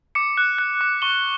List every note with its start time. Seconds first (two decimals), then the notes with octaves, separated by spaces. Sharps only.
0.15 D6 C#7
0.37 F#6
0.58 F#6
0.81 D6
1.02 C#6 G7